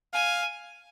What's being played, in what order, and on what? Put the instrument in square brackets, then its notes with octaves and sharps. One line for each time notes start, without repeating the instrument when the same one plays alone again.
[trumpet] F5 [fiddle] G#5